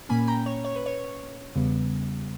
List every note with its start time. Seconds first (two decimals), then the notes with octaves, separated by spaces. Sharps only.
0.09 A#2 A#3 C#4 G#5 B5
0.27 G5 A#5
0.46 C#5
0.65 C#5
0.76 B4
0.86 C#5
1.56 E2 C#3 G3 B3